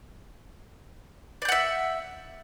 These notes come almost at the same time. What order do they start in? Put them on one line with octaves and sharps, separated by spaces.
D5 G6 F#5 E5